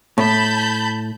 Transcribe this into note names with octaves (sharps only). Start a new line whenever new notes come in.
A2 A5 B5 G6